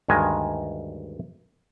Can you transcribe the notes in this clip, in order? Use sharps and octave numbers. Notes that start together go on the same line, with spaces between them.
D2 G2 D#3 G#3 D#5 G#5